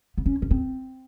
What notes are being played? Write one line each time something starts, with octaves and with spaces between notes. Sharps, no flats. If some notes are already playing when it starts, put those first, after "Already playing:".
B3
C#4
C#4
C4